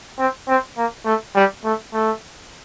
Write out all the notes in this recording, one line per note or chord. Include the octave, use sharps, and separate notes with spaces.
C4
C4
A#3
A3
G3
A3
A3